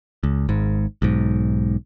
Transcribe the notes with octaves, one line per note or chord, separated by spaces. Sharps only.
C#2
G#1 G#2
B1 G#2